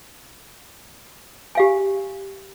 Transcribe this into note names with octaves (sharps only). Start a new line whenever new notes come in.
G4 F5 G#5